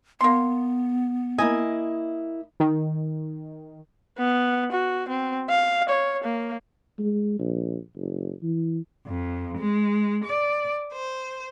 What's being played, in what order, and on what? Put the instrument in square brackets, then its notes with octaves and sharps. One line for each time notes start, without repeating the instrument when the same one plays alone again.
[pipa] A#3 C6 [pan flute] B3
[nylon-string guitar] A#3 E4 G#5 [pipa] D#5
[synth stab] D#3
[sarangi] B3
F#4
C4
F5
C#5
A#3
[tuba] G#3
A#1
F#1
E3
[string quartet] F2
G#3
D5
C5